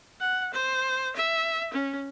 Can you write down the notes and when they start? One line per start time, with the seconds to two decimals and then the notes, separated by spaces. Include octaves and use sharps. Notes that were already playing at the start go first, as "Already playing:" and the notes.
0.20 F#5
0.53 C5
1.16 E5
1.73 C#4